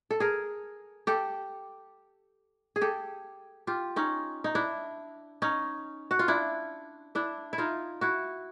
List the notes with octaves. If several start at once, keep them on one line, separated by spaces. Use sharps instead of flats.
A4
G#4 A#4
G4 A4
G#4
G4 A4
F4 G4
C#4 D#4
D#4
D4 E4
C#4 D#4
F#4
F4
D4 E4
D4 E4
E4
D#4 F4
E4 F#4